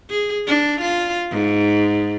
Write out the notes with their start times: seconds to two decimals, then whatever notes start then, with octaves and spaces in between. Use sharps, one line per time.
0.10 G#4
0.48 D4
0.81 F4
1.31 G#2